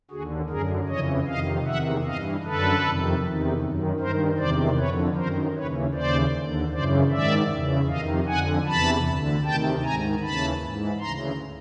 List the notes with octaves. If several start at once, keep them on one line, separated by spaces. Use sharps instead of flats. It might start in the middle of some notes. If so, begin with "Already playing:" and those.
D#2 D3 F#4 G#4
F#2 D3 G#4 A#4
F2 C#3 E3 C#5 D#5
F2 C3 D#3 D#5 F5
E2 C3 D#3 E5 F#5
G2 E3 D#5 F5
F#2 D3 A4 B4
F2 C3 D#3
E2 C3 D#3
F#2 D#3
G2 D#3 A#4 C5
E2 C3 D#3 C5 D5
F2 D3 B4 C#5
F#2 D#3 A#4 C5
D#2 C#3 E3 B4 C#5
D#2 C#3 E3 C5 D5
D#2 D3
F#2 C#3 E3 C5 D5
G#2 D#3 D5 E5
E2 C#3 E3
F2 C3 D#3 D#5 F5
F2 D3 F#5 G#5
E2 C3 E3 A5 B5
D2 D3
D2 C3 D#3 G5 A5
G#2 D#3 G#5 A#5
D#2 C#3 E3 A5 B5
G#2 E3
D2 C#3 E3 A#5 C6